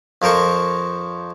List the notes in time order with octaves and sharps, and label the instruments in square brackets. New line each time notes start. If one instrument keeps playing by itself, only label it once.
[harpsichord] F2 F3 A#4 C5 C#6